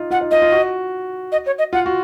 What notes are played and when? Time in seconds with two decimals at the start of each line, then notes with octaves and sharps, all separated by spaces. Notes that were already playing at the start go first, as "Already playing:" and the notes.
Already playing: D#4 F4
0.11 F4 F#5
0.21 D#4
0.31 F4 D#5
0.42 F4
0.52 F#4
1.32 D#5
1.46 C#5
1.59 D#5
1.73 F4 F#5
1.86 F#4